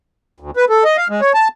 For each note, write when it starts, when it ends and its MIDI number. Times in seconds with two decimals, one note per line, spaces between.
0.40 0.51 38
0.57 0.65 71
0.70 0.84 69
0.84 0.97 75
0.97 1.08 77
1.10 1.21 56
1.21 1.33 73
1.34 1.48 81